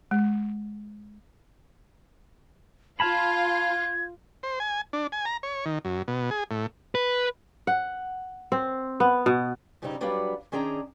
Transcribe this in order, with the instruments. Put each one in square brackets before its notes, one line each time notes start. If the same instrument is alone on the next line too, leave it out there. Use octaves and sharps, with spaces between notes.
[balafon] G#3
[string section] F4 [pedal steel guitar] F5 A5 B5 [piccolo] G#6
[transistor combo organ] C5
G#5
D4
G#5
A#5
C#5
D#3
F#2
B2
G#4
A2
[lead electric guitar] B4
[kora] F#5
C4
B3
B2
[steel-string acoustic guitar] G2 C#3 G3 B3 C4 D#4
F#3 G3 D4 F#4 B4 F5
D#3 C#4 D4 G#4 G5 A#5